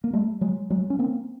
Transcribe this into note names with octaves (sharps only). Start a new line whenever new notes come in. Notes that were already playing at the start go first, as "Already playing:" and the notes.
A#3
G3 A3
F#3 G#3
F#3 G#3
C#4
A#3 C4